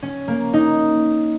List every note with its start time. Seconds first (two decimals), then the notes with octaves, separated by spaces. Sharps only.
0.02 C#4
0.28 A#3
0.53 D#4